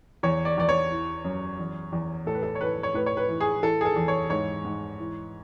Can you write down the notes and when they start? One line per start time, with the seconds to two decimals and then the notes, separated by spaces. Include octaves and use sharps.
0.23 E2 C#5
0.45 D5
0.58 E2 D5
0.69 C#5
0.90 E3
1.25 F#2
1.59 E2
1.92 E2
2.26 A2 A4
2.35 B4
2.43 A4
2.55 C#5
2.61 E3 B4
2.83 C#5
2.94 A2 B4
3.06 C#5
3.17 B4
3.29 E3
3.40 G#4
3.63 E3 A4
3.81 G#4
3.85 A4
3.96 E2
4.08 C#5
4.30 G#2 C#5
4.65 G#2
4.99 E3